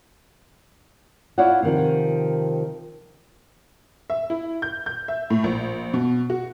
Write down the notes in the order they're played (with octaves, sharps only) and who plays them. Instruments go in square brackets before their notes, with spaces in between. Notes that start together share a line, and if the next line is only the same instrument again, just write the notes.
[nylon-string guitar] E4 F4 C#5 D5 E5 F#5
C3 D#3 F3
[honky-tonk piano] E5
E4
G6
G6
E5
A2
A#1
B2
F#4